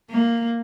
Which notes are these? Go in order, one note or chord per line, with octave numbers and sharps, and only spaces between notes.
A#3